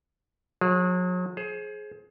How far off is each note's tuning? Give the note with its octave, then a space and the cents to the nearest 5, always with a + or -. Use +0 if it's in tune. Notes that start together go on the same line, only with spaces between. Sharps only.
F#3 -40 G#4 +0
G#4 +25 C5 +30